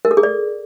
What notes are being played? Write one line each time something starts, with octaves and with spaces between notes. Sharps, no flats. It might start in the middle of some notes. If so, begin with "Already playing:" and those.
A#4
A4
G#4
D5